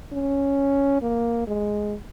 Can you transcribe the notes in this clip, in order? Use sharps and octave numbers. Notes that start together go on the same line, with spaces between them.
C#4
A#3
G#3